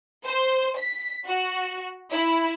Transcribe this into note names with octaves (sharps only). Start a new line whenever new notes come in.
C5
B6
F#4
E4